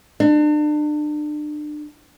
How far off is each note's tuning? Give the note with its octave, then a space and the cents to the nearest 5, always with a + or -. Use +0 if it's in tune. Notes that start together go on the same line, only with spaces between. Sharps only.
D4 +35